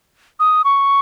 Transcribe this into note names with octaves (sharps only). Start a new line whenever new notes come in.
D#6
C#6